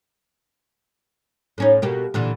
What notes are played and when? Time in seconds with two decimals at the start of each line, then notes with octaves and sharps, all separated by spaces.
1.58 A2 C#4 D#4
1.82 B2 A#3 G4
2.14 A#2 D3 E3